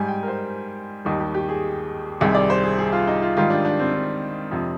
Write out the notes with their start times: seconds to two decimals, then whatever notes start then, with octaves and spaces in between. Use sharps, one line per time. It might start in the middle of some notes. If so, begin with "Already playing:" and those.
Already playing: G#2 G3 G#5
0.08 G5
0.23 A#4
0.28 C5
1.05 D#2 D#3 G3
1.20 G4
1.34 G4
1.49 G#4
2.21 C2 C3 D#3 G3 G#4
2.35 D5
2.50 C5
2.64 G#4
2.78 G#4
2.92 F4
3.07 D#4
3.22 F4
3.37 G#2 D#3 G3 F4
3.50 D4
3.65 D4
3.79 C4
3.94 D4
4.51 F2 C3 F3